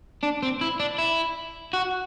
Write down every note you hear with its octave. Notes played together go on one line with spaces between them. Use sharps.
D4
C4
E4
D4
E4
F#4